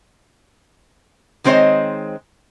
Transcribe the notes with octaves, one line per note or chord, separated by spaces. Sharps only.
D#3 G#3 C4 C5 C#5 D#5